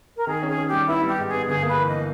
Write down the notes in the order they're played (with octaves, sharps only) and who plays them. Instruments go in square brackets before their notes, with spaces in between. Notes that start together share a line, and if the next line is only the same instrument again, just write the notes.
[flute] A#4
[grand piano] D#3 [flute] G#4
[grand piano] C#4
[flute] G#4
[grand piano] C#4
[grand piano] G3 [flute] G4
[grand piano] B3 [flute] E4
[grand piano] G3
[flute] G4
[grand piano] G#2
[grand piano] B3 [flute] G#4
[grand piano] G1 [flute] G#4
[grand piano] A#3
[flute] B4
[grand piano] E3
[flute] D#5